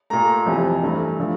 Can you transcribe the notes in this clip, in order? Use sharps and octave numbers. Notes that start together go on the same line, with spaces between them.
A#2 A3 A#5
F2 C3 E3
G2 E3 A3
D3 F3 A3